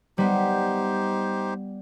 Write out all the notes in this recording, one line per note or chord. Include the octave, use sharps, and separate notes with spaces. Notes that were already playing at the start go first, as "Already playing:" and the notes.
G3 B3 D#4 G4 C5